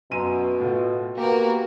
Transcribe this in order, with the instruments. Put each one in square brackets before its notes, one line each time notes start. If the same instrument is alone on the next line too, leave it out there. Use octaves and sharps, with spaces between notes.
[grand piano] F#2 C6 D#7 [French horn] B2
[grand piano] A2 F4
[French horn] A#3 [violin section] B3 F#4 A#4 [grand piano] G4